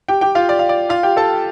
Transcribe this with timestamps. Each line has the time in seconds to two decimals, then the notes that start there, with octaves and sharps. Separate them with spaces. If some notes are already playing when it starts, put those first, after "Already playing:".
0.08 G4 G5
0.21 G4 G5
0.35 F4 F5
0.49 D5
0.59 F5
0.69 D5
0.89 F4 F5
1.03 G4 G5
1.17 A4 A5